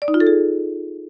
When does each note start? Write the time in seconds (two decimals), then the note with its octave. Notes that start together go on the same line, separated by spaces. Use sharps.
0.02 D5
0.08 D#4
0.14 F4
0.20 A4
0.27 G#4